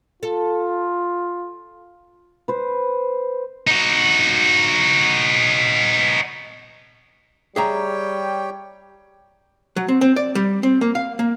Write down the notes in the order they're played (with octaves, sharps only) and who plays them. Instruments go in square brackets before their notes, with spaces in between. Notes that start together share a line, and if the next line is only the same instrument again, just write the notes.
[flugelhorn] F4 [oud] A4
[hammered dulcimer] B4 C5
[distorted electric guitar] D#4 F#4
[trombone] G3 [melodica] G4 C#5 G5 [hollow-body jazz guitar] G#4 E5 A#5
[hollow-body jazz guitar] F#3
C4
C4
D5
G3
C4
A#3
F5
A#3